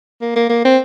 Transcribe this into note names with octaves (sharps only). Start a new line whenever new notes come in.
A#3
A#3
A#3
C4